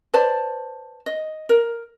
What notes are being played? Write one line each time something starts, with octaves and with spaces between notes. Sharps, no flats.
B4 C5 D5 A5
D#5
A#4